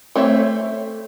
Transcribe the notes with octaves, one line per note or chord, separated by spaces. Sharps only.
A3 C4 C#5 E5